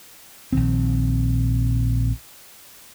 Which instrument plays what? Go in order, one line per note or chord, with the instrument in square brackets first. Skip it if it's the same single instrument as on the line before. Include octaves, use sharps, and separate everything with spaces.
[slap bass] A#1 D#3 C4